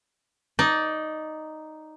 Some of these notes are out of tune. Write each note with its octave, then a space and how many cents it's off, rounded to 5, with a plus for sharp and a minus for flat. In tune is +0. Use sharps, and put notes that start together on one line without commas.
D#4 +0 D5 -15